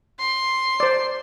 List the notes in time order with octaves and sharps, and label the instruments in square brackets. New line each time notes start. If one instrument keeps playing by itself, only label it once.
[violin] C6
[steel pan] C5 D5